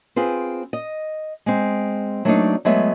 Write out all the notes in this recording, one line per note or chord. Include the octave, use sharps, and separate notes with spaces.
C4 F4 G#4 B4 C5
D#5
G#3 C4
F#3 A3 A#3 C4 D4 D#4
F#3 G#3 A3 B3 E5